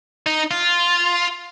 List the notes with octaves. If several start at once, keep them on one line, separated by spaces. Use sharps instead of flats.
D#4
F4